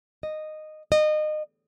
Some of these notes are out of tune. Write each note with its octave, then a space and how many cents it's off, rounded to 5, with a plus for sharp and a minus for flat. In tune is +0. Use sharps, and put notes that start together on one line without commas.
D#5 -10
D#5 -25